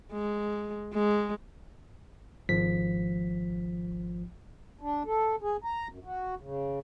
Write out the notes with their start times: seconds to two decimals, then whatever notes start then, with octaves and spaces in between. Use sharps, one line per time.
0.12 G#3
0.93 G#3
2.49 G#1 F3 B6
4.81 D4
5.06 A4
5.42 G#4
5.64 A#5
5.89 F#2
6.05 F#4
6.40 C#3